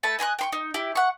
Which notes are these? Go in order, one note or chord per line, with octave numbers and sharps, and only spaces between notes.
A3 A5 B5
D#5 G#5 C6 F#6
G5 C6 C#6
D#4
E4 G4
F#5 C#6